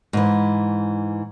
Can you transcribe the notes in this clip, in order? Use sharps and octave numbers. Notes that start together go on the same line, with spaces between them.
G#2 E3